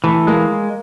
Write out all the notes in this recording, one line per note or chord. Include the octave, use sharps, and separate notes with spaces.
E3 A3
G#3 A#3